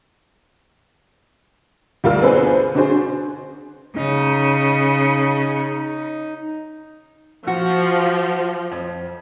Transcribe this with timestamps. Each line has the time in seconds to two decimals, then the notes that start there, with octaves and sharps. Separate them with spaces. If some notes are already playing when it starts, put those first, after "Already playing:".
2.04 D2 G3 F4 A#4 E6
2.22 B3 C4 D4 G#4 B4 C5
2.75 D3 C#4 D4 F#4 G#4 C5
3.96 C#3 D#4
7.47 F3 F#4
8.71 F2